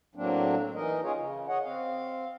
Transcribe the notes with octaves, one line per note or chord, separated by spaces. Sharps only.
A2 F#3 A#3 C4 D4
E3 D#4 A#4 D#5
C#4 F4 G#4 C#5
C#3
C#5 D#5 F#5
C4 F5